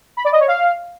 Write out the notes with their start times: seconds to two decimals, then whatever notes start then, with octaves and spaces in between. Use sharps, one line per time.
0.17 B5
0.25 D5
0.32 D#5
0.40 C#5
0.48 F5